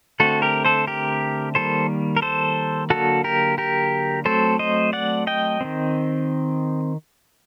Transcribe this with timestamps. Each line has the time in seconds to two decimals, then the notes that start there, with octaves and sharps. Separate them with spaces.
0.20 D3 A3 C4 F#4 A4
0.42 G4 A#4
0.65 A4 C5
0.87 G4 A#4
1.55 D#3 G3 A#3 A4 C5
2.17 A#4
2.22 A4 C5
2.90 D3 F#3 A#3 F#4 A4
3.24 G4 A#4
3.58 G4 A#4
4.25 F#3 A3 C4 A4 C5
4.59 C5 D#5
4.93 D5 F#5
5.27 D#5 G5
5.61 D#3 A3 C4